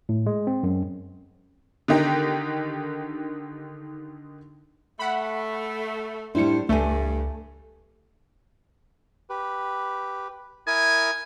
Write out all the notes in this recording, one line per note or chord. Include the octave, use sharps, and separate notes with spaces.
A2
G#3
C4
F#2
D3 D#3 D#4 G4
A3 F#5 B5
A2 G3 D4 E4 C5 C#7
C#2 G2 A3 A4 G#5
G4 B4
E4 A#4 G#5 D#6